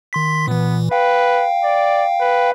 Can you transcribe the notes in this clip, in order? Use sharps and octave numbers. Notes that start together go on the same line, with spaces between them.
D#3 C6 B6
A#2 E3 B3
B4 F5 G5
D5
B4